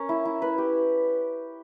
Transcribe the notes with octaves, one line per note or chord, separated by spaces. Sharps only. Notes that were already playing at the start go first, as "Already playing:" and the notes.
Already playing: C#4 A#4
E4
E4
B4
G4